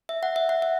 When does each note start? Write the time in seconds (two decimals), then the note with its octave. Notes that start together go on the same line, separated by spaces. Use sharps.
0.09 E5
0.23 F#5
0.36 E5
0.49 F#5
0.62 E5